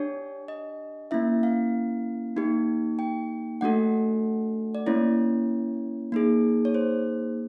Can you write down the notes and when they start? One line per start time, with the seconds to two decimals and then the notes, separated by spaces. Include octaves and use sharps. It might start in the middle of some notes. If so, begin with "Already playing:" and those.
Already playing: D4 G4 C#5
0.48 D#5
1.11 A#3 C#4 E4 E5
1.43 F5
2.36 A#3 D#4 G4
2.99 G5
3.61 A3 D4 F#4 A4 F#5
4.75 D5
4.86 A#3 C#4 E4 C#5
6.12 A#3 D#4 G#4
6.65 C#5
6.74 C5